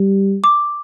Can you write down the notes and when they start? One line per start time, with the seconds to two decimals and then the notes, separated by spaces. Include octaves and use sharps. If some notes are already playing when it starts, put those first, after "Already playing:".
Already playing: G3
0.44 D6